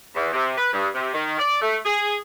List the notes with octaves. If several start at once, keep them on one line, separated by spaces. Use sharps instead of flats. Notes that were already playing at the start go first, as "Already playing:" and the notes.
E2
C3
B4
G2
C3
D#3
D5
A3
G#4